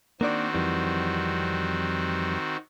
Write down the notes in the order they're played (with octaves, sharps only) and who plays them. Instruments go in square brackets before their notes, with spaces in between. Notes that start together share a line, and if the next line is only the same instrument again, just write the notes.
[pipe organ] D#3 C4 F#4 [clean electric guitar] A#3 D4 D5
[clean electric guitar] F2 E3 G3